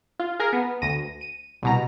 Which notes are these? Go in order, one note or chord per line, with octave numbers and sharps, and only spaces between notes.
F4
G#4 A#4
B3
D2 A#6 D#7
D#7
C2 B2 A#5